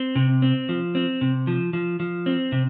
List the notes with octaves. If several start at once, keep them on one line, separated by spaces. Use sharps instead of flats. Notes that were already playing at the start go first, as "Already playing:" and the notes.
Already playing: C4
C3
C4
F3
C4
C3
F3
F3
F3
C4
C3